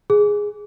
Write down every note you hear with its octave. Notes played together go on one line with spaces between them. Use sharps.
G#4